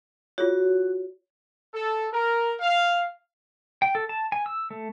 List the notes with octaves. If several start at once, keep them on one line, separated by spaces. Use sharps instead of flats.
F4 F#4 G#4 C#5
A4
A#4
F5
G5
A4
A5
G#5
E6
A3